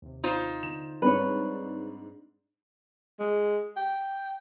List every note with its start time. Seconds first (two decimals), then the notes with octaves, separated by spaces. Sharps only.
0.02 D#2 C3
0.24 D#4 F4 C5
0.63 D3 E7
1.02 G#2 G3 C4 D4 B4 C#5
3.20 G#3
3.77 G5